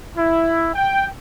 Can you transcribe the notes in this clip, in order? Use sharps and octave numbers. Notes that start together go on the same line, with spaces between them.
E4
G5